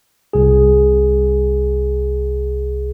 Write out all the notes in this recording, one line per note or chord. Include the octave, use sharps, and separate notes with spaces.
C2 G#4